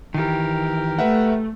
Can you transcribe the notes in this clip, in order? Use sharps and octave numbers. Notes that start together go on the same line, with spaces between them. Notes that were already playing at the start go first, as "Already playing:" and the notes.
D#3 E3 G4 A#4
A3 B4 E5 F#5